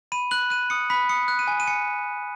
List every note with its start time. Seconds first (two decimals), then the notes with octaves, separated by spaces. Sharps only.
0.12 B5 D#7
0.31 F#6 F#7
0.50 F#6 D#7
0.70 D#6 C#7
0.90 B5 B6
1.09 D#6 C#7
1.28 F#6
1.39 D#7
1.48 G#5
1.60 D#7
1.67 G#5 C#7